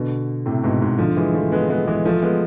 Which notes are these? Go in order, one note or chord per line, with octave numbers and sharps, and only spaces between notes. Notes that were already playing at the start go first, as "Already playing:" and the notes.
Already playing: B2 D3
A2 C3
G#2 B2
G#2
D3 F3
E3 G#3
F3 A3
G#3 B3
G#3 B3
E3 G#3
F3 A3
G#3 B3